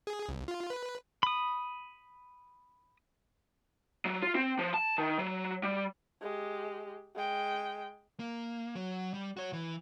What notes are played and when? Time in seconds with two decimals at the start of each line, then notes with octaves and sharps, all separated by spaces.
0.07 G#4
0.29 C2
0.48 F4
0.70 B4
1.23 B5 D#6
4.05 F#3
4.22 F4
4.35 C4
4.59 F3
4.74 A5
4.98 D#3
5.19 F#3
5.63 G3
6.22 G#3 G4
7.15 G#3 G5
8.20 A#3
8.75 F#3
9.14 G3
9.37 F#4 C#5
9.53 E3